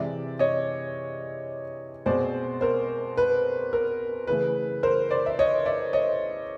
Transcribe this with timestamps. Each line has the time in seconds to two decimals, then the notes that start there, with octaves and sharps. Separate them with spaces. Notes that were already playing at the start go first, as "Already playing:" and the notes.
Already playing: C3 E3 G#3 D5 E5
0.39 C#5 D#5
2.06 B2 G#3 C4 C5 D5
2.61 A#4 C5
3.17 B4
3.73 A#4
4.27 C#3 E3 A3 B4
4.83 A#4 C5
5.11 C5 D5
5.26 E5
5.39 C#5 D#5
5.66 D5 E5
5.93 C#5 D#5